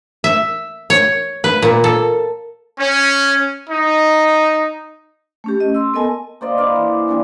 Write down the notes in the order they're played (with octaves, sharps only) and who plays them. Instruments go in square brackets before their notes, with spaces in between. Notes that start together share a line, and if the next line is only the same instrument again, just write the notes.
[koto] E5
C#5
B4
A#2
A4
[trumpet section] C#4
D#4
[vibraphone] A3 C#4 G4
D#5
C6 E6
B3 A4 A#4 D#5 G#5 A5
[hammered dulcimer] A#3 C5 D5 D#5
E4 C5 D5 F5
E3
E3 G3 A#3 D4